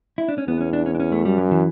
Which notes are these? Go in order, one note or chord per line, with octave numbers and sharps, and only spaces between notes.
E4
D4
C#4
E2 B3
C#4
D4
C#4
D4
C#4
A3
F#2 G3
F#3
E3